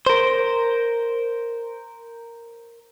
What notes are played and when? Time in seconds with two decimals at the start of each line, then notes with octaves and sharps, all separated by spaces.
0.06 A#4 C5